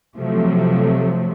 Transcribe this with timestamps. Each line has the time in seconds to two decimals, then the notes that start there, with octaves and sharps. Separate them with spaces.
0.16 C3 F3 F#3 A3